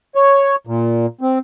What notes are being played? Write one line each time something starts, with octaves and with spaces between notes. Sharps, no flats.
C#5
A#2
C4